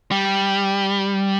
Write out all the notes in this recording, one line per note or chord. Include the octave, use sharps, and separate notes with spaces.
G3